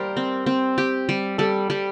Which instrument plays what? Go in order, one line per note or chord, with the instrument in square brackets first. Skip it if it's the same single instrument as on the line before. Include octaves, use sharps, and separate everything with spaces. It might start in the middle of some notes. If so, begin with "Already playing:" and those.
Already playing: [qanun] G3 G4 [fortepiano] A#4 C5 D5
[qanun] C4
C4
G4
G3
[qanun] G3 [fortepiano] A4
[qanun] G3